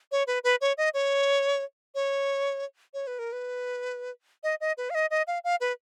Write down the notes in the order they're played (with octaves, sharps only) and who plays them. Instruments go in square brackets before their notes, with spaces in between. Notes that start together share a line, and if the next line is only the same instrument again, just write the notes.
[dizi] C#5
B4
B4
C#5
D#5
C#5
C#5
C#5
B4
A#4
B4
D#5
D#5
B4
F5
D#5
D#5
F5
F5
B4